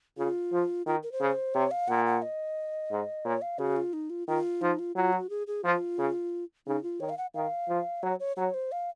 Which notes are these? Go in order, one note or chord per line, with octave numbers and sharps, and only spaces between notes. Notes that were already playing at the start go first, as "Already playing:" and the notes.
C#3 F4
F3
D#3 F4
A#4
C5
C#3
C3 C#5
F5
A#2 F#5
F#5
D#5
G#2
A#2 C#5
F5
C#3 F#4
F4
D#4
F4
D#3 F4
F3 D#4
F4
F#3 F4
F#4
G#4
G#4
F3 F4
C#3
C#3 D#4
F4
D#3 C#5
F5
F#5
D#3 F5
F3
F#3 C#5
C#5
F#3 C#5
C5
F5